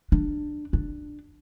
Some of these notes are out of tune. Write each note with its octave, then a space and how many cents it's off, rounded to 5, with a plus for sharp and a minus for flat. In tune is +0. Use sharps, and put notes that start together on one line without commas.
D4 +15
D4 +15